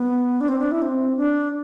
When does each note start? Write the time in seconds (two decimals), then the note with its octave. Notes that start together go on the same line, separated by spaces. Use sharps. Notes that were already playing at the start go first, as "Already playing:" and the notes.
Already playing: B3
0.41 D4
0.48 C4
0.59 D4
0.72 E4
0.82 C4
1.17 D4